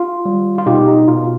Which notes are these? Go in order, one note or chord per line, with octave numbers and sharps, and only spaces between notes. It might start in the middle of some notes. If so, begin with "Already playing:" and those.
Already playing: F4
G3
F4
B2 D#4 G4
D#4
B2 F4